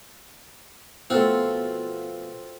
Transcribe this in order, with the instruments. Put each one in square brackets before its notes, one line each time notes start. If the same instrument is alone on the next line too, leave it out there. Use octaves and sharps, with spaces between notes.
[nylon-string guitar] B2 F3 A3 [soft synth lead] B3 [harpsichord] C4 F4 [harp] F#4 A4